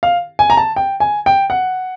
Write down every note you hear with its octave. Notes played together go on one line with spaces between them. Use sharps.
F5
G#5
A#5
A5
G5
G#5
G5
F#5